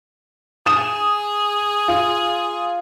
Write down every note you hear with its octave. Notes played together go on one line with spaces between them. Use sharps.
G#4 D#6 E7
F4